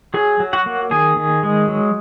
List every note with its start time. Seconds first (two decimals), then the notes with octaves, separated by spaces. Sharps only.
0.14 F#3 G#4 G#5
0.40 F#3
0.53 F#4 F#5
0.66 A#3
0.91 D#3 G#4 G#5
1.17 D#3
1.43 G#3
1.68 F#3